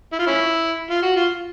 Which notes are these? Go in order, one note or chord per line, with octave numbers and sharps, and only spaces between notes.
E4
F4
C#4 E4
F4
F#4
F4